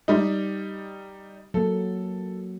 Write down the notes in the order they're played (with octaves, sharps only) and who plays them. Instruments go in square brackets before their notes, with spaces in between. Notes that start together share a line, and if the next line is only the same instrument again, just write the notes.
[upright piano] G3 D#4
[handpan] F#3 A#3 [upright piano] A4